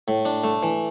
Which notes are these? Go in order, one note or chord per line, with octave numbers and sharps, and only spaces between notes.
A2
D4
A3
E3